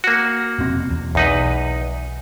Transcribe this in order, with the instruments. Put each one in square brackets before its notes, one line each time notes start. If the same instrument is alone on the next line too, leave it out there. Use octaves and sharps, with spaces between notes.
[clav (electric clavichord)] A#3 F#4
[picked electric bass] F1 B2 C4
E2
[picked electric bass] B1 [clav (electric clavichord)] E2 D#4 B4